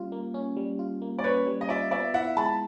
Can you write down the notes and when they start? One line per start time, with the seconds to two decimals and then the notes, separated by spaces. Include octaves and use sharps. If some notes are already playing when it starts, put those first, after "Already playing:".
Already playing: G3 A#3 C#4 F4
0.12 A#3
0.34 C#4
0.57 G3
0.79 F4
1.02 A#3
1.19 D5
1.24 C#4 B4 C#5
1.47 G3
1.61 D#5
1.69 F4 D5 E5
1.91 B3 D5 E5
2.14 E4 E5 F#5
2.37 G#3 A5 B5